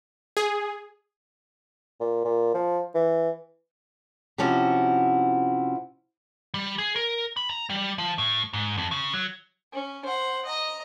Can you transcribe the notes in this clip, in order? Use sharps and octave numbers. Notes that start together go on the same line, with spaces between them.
G#4
A#2
A#2
F3
E3
C3 F3 C#4 E4 F#4
G3
G#4
A#4
B5
A#5
G3
F3
A2
G#2
F2
C#3
F#3
C#4
C5 F#5
D#5 A#5